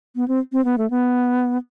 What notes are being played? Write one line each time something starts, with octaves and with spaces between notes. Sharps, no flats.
B3
C4
C4
B3
A3
B3